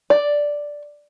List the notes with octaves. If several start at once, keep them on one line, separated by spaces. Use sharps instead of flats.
D5